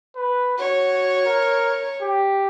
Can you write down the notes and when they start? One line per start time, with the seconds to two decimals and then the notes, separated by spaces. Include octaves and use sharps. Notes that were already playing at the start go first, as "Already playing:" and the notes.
0.16 B4
0.58 F#4 C#5
1.26 A#4
2.01 G4